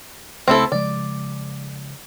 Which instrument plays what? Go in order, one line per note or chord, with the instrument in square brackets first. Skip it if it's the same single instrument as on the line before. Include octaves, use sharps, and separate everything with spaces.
[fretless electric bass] C#2 C#3 A3 [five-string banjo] C4 E4 A4
[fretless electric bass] C#3 F3 G#3 [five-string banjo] D5